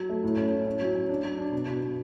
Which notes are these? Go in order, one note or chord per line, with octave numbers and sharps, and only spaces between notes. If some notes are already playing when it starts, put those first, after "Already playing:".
Already playing: F#3
A3
A2
C#4
A2
C#4
F#3
C#4
D4
F#3
D4
B2
B2
B2